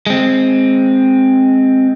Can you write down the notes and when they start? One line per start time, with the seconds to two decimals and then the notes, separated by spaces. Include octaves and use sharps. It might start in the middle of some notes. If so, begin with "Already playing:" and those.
0.07 G#3 C4